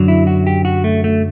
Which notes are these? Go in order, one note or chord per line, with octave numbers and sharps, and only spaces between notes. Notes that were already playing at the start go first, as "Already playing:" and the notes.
Already playing: F#2 D3 F#3
E4
F#4
G4
F#4
A3
A3